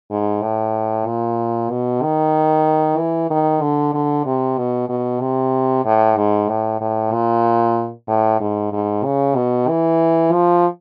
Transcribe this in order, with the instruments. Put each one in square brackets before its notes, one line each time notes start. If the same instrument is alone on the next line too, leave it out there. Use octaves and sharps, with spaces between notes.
[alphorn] G#2
A2
A#2
B2
D#3
E3
D#3
D3
D3
C3
B2
B2
C3
A2
G#2
A2
A2
A#2
A2
G#2
G#2
C#3
B2
E3
F3